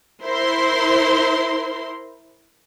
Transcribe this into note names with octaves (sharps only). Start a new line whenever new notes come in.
E4 A#4 C5 C6